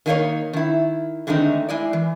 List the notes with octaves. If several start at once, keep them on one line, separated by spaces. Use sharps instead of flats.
D#3 G#3 A#3 D4 D#4 C#5
D#3 E4
D3 D#3 G#3 A3 C4 D#4
G#3 E4 D5
E3